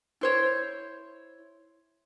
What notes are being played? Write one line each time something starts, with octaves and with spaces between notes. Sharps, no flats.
E4 C5 C#5